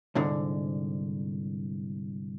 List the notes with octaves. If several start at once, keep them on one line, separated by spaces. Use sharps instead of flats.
C2 G#2 D3